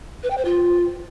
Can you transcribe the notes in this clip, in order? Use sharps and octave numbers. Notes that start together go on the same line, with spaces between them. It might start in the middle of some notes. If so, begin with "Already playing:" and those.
B4
G5
C5
F4